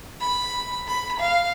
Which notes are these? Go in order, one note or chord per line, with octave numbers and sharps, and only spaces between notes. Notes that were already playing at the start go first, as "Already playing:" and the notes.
B5
B5
F5